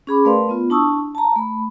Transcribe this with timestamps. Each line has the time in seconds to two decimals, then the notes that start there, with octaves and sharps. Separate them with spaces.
0.07 C#4 G#4 B5 D6
0.25 A3 A#4 B4 D5 F5 C6
0.49 B3 F4
0.70 D4 E4 A5 C#6 D#6 E6
1.15 A5 A#5
1.36 A3 B5